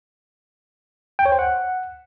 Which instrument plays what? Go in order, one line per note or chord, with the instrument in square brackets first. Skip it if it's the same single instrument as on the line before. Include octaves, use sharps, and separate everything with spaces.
[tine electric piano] G5
C#5
C5
F#5